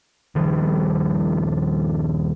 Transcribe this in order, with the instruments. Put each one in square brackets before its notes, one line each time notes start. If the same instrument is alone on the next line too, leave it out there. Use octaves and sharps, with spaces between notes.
[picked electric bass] D#1 D#3 F3 G3